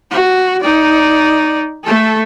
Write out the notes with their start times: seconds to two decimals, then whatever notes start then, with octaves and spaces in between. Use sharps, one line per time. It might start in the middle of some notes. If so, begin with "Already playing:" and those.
0.11 F#4
0.61 D#4 D5
1.84 A3 A4